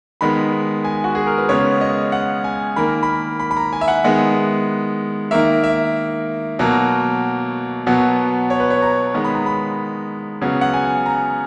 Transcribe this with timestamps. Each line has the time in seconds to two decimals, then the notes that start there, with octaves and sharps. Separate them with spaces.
0.21 D#3 G#3 B3 B5
0.84 G#5
1.04 F#4
1.15 G#4
1.27 A#4
1.38 B4
1.49 C#3 G#3 B3 C#5
1.81 D#5
2.12 F#5
2.44 G#5
2.76 D#3 A#3 B5
3.03 B5
3.40 B5
3.51 B5
3.57 A#5
3.73 G#5
3.81 E5
3.88 F#5
4.04 D#3 G#3 B3
5.31 D#3 A#3 E5
5.64 E5
6.59 B2 F#3 A#3
7.87 B2 F#3 B3
8.50 C#5
8.60 B4
8.70 C#5
8.82 A#5
9.14 D#3 G#3 B3
9.25 B5
9.35 A#5
9.46 B5
10.42 C#3 F#3 B3
10.61 F#5
10.74 G#5
11.06 A#5